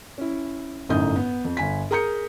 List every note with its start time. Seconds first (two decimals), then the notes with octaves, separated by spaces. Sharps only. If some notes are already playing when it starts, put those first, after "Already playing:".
0.18 C#4 E4
0.89 G1 F#2 A2 D#4 D#6 G6
1.16 B3
1.45 F2
1.57 G1 G#5 B6
1.91 G#4 A#4 A#5 D#6 G6 C#7